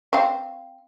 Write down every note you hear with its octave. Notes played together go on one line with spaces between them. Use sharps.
C4 F5